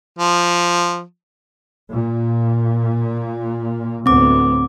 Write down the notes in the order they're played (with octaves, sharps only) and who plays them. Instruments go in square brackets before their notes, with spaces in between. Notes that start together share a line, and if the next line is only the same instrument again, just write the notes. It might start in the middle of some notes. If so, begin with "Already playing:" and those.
[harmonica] F3
[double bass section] A#2
[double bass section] D2 A2 B3 [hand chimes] C4 D6